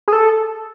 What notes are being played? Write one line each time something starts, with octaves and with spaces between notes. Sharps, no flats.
G#4
A4